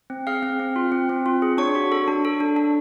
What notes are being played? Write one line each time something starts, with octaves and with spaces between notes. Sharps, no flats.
C4
G#4 F5 F6
C4
C4
F4
C4
C4
F4
G#4
D4 C#5 C#6
F#4
A4
D4
A4
D4
D4